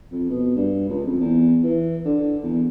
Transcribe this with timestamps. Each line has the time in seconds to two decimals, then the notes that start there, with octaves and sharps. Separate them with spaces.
0.12 F2
0.30 B2
0.56 G2
0.89 C#2
1.05 F2
1.20 E2
1.63 E3
2.05 D3
2.43 E2